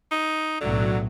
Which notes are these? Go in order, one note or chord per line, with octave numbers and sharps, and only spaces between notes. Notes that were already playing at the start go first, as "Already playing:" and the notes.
D#4
B1 A2 D3 F#3